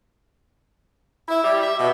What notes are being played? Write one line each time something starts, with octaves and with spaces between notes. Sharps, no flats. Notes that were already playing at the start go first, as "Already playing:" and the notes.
E4
G3
E5
B2